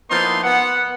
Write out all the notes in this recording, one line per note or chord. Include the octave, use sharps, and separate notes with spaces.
F3 A#3 B3 D#4 E4 C6
B3 F#5